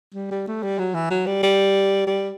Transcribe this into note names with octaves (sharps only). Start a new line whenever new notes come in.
G3
G3
A3
G3
F#3
E3
F#3
G3
G3
G3